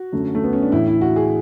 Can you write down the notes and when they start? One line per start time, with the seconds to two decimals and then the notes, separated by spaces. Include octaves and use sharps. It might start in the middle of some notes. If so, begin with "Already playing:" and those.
Already playing: F#4
0.12 F#2 D3 A3
0.35 A3
0.44 B3
0.53 C#4
0.62 D4
0.72 A2 E3 A3 E4
0.87 E4
1.01 F#4
1.16 G#4